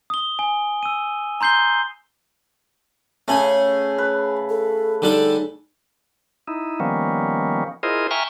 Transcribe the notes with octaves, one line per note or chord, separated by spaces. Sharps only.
D#6 G7
G#5
E6 D#7
A#5 C6 G6 C7 G7
C#3 A3 C#4 G#4
B4
A4
D3 G3 D#4 A4
D#4 E4
D#3 F3 G3 A#3 B3 C#4
E4 F4 G#4 A#4 C5 D#5
E5 G5 G#5 A#5 C#6 F6